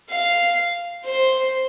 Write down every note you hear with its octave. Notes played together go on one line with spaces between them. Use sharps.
F5
C5